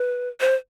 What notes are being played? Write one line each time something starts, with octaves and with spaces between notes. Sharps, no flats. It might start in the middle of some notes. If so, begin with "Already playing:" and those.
Already playing: B4
C5